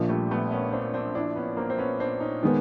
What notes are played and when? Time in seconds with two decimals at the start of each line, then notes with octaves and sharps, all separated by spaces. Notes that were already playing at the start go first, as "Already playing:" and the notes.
Already playing: A#1 A#2 F3
0.09 G3 A3
0.31 A3 B3
0.51 B3 C#4
0.72 C4 D4
0.94 C4 D4
1.15 D4 E4
1.36 B3 C#4
1.57 A#3 C4
1.70 C4
1.78 B3 C#4
1.99 C4 D4
2.20 C#4 D#4
2.43 D#3 G#3 B3